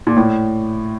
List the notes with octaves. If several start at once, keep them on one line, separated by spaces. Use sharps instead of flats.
A#2
A2